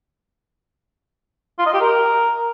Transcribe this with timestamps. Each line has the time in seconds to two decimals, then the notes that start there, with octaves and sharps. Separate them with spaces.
1.59 F4
1.66 D#5
1.74 G4
1.81 A#4